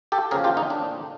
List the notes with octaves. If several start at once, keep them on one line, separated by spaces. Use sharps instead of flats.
G4 A4
E2 C#3 F3 A#3 C#4 G#4 A#4
F4 G4
D#4
A2 F3 A#3 D4